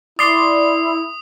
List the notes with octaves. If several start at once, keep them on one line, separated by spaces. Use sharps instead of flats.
E4 D5 C6 D#6